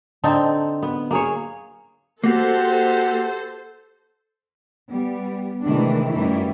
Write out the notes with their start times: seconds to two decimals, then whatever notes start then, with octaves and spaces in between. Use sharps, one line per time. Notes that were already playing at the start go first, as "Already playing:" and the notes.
0.24 D3 C4 D#4 A4
0.83 B3
1.11 A#3 G#4 C#5
2.24 A#3 F#4 G4 A4 C5
4.91 G3 B3
5.63 C3 D#3 E3 G#3 A3 D4
6.12 F#2 E3 G3 A3 D#4 E4